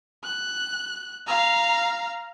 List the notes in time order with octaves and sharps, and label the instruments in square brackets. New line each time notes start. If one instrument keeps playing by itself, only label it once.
[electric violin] F#6
F5 A#5